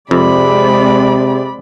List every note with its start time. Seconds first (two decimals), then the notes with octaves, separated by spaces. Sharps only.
0.11 F2 C3 G#3 C4 D5 B5